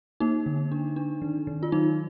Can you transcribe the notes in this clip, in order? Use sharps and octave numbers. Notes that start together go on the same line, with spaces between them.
A#3 D#4
D3
D4
D4
D#3
D#3
F4
F#3 D#4